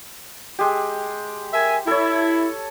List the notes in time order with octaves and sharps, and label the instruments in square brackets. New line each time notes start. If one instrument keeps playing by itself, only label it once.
[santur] G#3 G4
[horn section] A#4 E5 G#5
[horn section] E4 [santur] A4 C#5